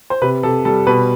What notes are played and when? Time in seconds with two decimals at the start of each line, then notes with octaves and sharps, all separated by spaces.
0.10 C5
0.22 C3 B4
0.43 C3 A4
0.65 G3 A4
0.87 B2 B4